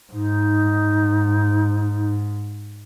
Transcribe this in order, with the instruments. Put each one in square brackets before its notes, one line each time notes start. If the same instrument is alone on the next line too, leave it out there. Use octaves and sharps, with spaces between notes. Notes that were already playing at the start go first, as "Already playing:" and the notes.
[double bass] G#2 [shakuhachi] D#4